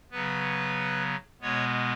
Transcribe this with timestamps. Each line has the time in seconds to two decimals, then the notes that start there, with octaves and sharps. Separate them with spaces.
0.11 C#3 F#3 B3 B4
1.41 B2 G#3 B3 C#5